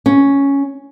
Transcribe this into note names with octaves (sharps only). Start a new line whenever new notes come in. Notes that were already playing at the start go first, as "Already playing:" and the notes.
C#4